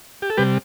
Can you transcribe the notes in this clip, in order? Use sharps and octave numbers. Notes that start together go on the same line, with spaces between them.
G4
A4
C3 G3 G4 B4